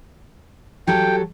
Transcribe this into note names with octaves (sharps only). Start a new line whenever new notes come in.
F#3 G4 A4 G5